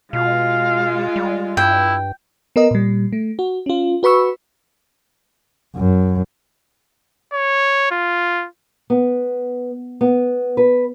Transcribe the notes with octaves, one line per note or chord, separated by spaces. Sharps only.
B2 G#3 F4 F5
G3
G2 E4 G5
B3 A#4 D#5
A#2 G3
A3
F#4
C#4 F4
F#4 B4 B5 C#6 E6
F#2
C#5
F4
B3
B3
B4